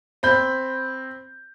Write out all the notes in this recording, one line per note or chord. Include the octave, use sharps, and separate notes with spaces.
C4 B5 G6